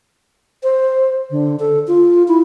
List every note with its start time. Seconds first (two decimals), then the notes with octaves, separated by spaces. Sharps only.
0.63 C5
1.31 D3
1.60 A4
1.88 F4
2.28 E4